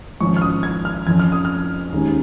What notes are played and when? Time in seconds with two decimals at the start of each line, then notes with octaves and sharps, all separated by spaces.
0.20 G#1 G#2 F3 C#4 C#6
0.36 F6
0.42 D#6
0.63 G#6
0.85 F6
1.07 F2 F3 C#4 G#6
1.20 F6
1.32 D#6
1.45 F6
1.93 D#2 C#3 G#3 D#4